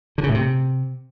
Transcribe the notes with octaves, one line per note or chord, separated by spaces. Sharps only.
D3
C#3
A2
C3